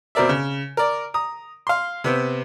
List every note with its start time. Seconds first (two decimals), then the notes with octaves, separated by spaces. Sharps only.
0.15 B2 C4 A#4 D5 E5
0.29 C#3
0.77 A#4 D5
1.14 A#5 D#6
1.67 F5 C6
2.04 C3 B3 C4